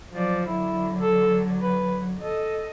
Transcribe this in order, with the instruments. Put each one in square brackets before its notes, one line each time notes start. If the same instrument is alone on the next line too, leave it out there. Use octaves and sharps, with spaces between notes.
[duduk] F3 [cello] F#3 D5
[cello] D3 F#3 [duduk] E4
[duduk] A4
B4
[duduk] A4 [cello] D#5